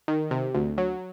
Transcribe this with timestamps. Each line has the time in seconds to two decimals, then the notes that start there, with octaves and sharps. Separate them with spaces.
0.08 D#3
0.31 C3
0.55 D2
0.78 F#3